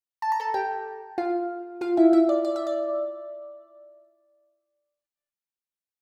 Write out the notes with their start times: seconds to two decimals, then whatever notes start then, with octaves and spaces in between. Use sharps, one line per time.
0.22 A5
0.32 A#5
0.40 A4 A5
0.54 G4 G5
1.18 F4 F5
1.81 F4 F5
1.97 E4 E5
2.13 E4 E5
2.29 D5
2.45 D5
2.56 E5
2.67 D5